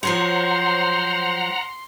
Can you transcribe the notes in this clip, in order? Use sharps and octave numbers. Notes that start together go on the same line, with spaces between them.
F3 F#3 C5 C#5 F#5 A#5 C6